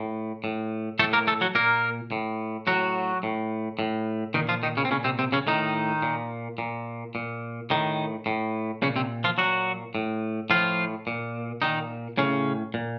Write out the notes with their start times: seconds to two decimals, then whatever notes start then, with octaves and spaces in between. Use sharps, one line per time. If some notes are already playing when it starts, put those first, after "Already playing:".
Already playing: A2
0.44 A2
0.99 A2 A3 A4
1.13 A#3 A#4
1.27 A3 A4
1.41 F#3 F#4
1.55 A#2 A#3 A#4
2.12 A2
2.67 A2 F#3 F#4
3.23 A2
3.79 A2
4.34 A#2 D#3 D#4
4.49 F3 F4
4.63 D#3 D#4
4.77 C#3 C#4
4.85 C4
4.91 A#2 C#3 C#4
5.04 C3 C4
5.19 C3 C4
5.32 C#3 C#4
5.47 A2 D#3 D#4
6.02 A#2
6.58 A#2
7.15 A#2
7.70 A2 D#3 D#4
8.26 A2
8.82 A#2 C#3 C#4
8.96 C3 C4
9.24 F3 F4
9.38 A#2 F#3 F#4
9.95 A2
10.50 A2 F3 F4
11.07 A#2
11.62 A#2 D#3 D#4
12.18 A2 C#3 C#4
12.74 A#2